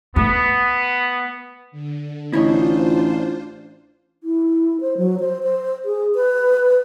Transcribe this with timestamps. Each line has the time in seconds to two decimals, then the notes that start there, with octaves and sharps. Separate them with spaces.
0.16 A3 B3
1.72 D3
2.33 A1 D4 E4 F4 C5 C#5 D#5
4.24 E4
4.81 C5
4.97 F#3
5.20 C5
5.43 C5
5.85 G#4
6.15 B4